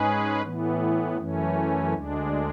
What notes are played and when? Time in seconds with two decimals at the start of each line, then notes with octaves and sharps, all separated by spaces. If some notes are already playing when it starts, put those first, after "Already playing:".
Already playing: G#2 G#3 C#4 G#4 B4
0.42 A2 E3 B3
1.17 F#2 E3 A3 C#4
1.93 D2 D3 G#3 D4